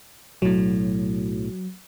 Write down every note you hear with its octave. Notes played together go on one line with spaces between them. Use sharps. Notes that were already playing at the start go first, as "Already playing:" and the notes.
B1 A2 F#3